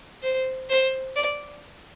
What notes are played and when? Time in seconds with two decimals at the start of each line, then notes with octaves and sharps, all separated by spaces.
0.22 C5
0.70 C5
1.16 D5